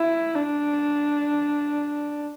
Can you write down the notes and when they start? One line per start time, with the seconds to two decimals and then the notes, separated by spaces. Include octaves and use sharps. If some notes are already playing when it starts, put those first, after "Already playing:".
Already playing: E4
0.35 D4